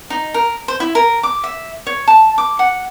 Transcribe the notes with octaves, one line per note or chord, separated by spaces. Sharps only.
D#4
A#4
C5
E4
A#4
D6
E5
C#5
A5
D6
F#5